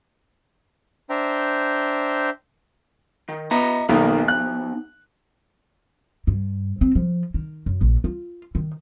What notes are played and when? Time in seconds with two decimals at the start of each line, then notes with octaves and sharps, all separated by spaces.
1.10 D4 C5 E5 G5 A#5
3.29 D#3
3.51 B3 D#5 E5 A#5
3.89 B1 D#3 F3 A#3 B3 D#4
4.28 F#6
6.27 G2
6.81 C4
6.95 F3
7.34 D#3
7.66 F#2
7.81 A#1
8.04 F4
8.55 D#3